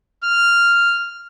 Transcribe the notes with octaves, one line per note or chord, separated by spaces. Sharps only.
F6